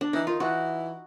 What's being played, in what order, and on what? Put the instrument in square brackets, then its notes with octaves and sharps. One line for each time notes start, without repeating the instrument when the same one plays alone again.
[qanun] D4
[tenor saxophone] E3 [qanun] D#4
[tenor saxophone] D#3 [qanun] F4
[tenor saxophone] E3 [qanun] F#4